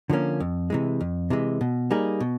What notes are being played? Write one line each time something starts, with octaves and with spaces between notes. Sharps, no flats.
D3 F3 A#3 C#4
F2
C3 E3 G#3
F2
C3 E3 G#3
B2
G3 A#3 D#4 G#4
B2